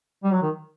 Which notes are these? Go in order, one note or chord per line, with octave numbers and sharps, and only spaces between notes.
G3
F#3
D#3